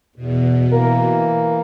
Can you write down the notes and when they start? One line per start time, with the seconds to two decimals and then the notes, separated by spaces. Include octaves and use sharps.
0.16 E2 B2
0.71 E3 A#3 A#4